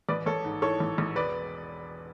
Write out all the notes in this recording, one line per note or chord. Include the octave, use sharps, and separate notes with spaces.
A1 B4 D5
A1 A4 C#5
G#2
E3 A4 C#5
A1
A1
E1 B4 D5